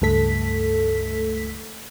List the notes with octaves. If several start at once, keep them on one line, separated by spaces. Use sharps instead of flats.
C#2 G2 A3 A4 B6